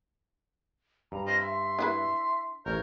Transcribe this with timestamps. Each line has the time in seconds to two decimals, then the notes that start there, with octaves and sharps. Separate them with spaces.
1.12 G2 A#5
1.27 C4 F4 D#5 A#6
1.41 E5 C6
1.79 D4 E4 B4
2.66 A1 A#4 C#5 G6